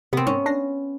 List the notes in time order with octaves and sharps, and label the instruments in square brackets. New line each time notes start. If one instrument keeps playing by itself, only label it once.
[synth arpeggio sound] C3 [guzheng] B3 C4
[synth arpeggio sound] G#2 [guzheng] C#4
[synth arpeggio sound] D4 A#6 C7